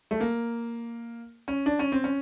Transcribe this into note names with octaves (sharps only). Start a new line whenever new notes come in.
A3
A#3
C#4
D4
C#4
C4
C#4